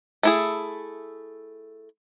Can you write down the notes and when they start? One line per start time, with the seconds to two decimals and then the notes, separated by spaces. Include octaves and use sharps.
0.23 A3 E4 G#4